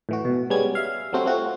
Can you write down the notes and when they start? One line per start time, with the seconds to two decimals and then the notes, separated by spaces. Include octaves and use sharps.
0.09 A2 E3 F#4
0.25 B2
0.50 G3 G#3 B3 C#4 G#6
0.75 E5 F5
1.13 F#3 G3 A3 C4 F#4
1.25 A3 C4 F4 F#4